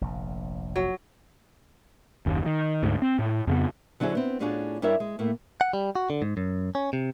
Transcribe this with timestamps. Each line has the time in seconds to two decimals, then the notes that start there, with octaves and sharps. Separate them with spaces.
0.01 F1 A#1
0.76 F#3
2.26 F#1 D#2
2.46 D#3
2.83 D2 G#2
3.02 C4
3.19 A2
3.47 F2 C#3 B3
4.00 D3 F#3 C#4 E4 G#4 C5
4.15 B3 C4
4.40 A2 C#4 D4 F4 F#4 G#4
4.82 G2 G3 E4 A#4 C#5 E5
5.00 G#3
5.19 A2 A3 A#3
5.61 F#5
5.73 G3
5.95 F#4
6.10 D3
6.22 G#2
6.37 F#2
6.75 C#4
6.93 C3